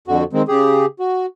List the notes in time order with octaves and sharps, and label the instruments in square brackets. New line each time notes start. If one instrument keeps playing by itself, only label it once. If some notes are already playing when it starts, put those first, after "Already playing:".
[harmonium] F2 D3 F#4
D#3 G#3 C4
C#3 G4 G#4
F#4